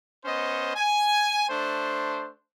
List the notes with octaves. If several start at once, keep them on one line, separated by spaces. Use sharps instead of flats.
B3 C#4 C5 D#5
G#5
A3 D4 C5